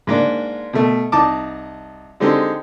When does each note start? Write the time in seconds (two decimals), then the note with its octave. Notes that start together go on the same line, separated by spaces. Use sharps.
0.07 G#2 A#3 D4
0.73 B2 A3
1.12 C2 D#4 A5 D6
2.20 D3 G#3 C4 D#4 G4 A4